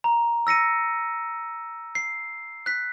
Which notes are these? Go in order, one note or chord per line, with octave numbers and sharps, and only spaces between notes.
A#5
E6 A#6 C#7 D#7
C7
F#6 B6